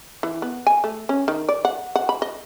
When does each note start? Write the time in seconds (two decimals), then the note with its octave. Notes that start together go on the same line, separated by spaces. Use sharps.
0.23 E3
0.42 B3
0.67 G#5
0.84 A3
1.09 C#4
1.28 D#3
1.49 D5
1.65 F#5
1.96 F#5
2.09 B5
2.22 D#5